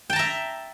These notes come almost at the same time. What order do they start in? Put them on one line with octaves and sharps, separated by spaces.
G5 A5 A#5 E5